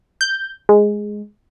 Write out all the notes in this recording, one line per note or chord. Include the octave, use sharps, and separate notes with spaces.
G6
G#3